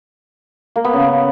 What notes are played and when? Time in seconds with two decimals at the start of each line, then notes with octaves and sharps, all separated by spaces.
0.76 A#3
0.85 B3
0.93 C#3